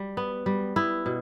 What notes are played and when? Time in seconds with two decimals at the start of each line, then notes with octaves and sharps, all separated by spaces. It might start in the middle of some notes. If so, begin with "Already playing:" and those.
Already playing: G3
0.17 B3
0.46 G3
0.76 B3 E4
1.06 B2